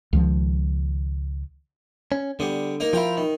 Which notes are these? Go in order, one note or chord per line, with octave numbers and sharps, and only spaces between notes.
C#2 D#3 F3
C#4
D3 G3 B3
A#3 D#4 A#4
F3 E4 F4 A#4 G5
D#3